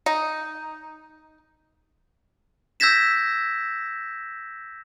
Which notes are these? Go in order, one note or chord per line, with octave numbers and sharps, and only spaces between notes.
D#4
E6 G6 G#6 A#6 B6 E7